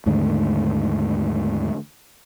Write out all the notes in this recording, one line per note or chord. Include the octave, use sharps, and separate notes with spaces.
D#2 G#2 D3 A3